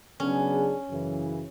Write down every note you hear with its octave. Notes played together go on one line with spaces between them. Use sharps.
C#3 F#3 B3 C#4 D4 G#4
F#2 C#3 E3